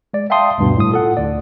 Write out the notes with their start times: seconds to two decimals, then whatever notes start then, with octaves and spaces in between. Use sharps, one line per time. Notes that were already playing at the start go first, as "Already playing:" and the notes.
0.14 G#3 D5
0.30 E5 F5 G5 A5 C6 D#6
0.58 D2 G2 B2
0.77 A2 D#6
0.92 F4 A4 F#5
1.17 D2 D5